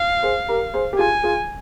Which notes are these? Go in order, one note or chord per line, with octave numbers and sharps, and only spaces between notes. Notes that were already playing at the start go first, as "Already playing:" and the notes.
Already playing: F5
G#4 C5
G4 A#4
G#4 C5
G4
F4 G#4 G#5
F4 G#4